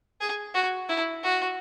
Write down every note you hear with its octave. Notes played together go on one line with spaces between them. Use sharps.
G#4
F#4
E4
F#4